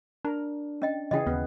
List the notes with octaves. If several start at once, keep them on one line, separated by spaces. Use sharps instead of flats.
D4 A#4
C#4 D#5 G5
C#3 E3 G#4 D#5 G5
D#2 B3